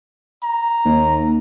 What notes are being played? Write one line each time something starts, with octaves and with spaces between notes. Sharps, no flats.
A#5
D#2